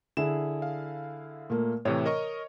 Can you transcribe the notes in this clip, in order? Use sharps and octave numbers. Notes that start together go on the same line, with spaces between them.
D3 E4 G#4 E7
F5
A#2 A3 A#3
A2 C3 E3 C#5
A#4 D#5 C#6